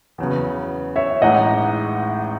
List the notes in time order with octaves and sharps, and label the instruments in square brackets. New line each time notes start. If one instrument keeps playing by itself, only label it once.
[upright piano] E2 C#3 F#3 B3
[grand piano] C#5 E5
[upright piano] A1 A2 G#3 D#4 [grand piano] D#5 F#5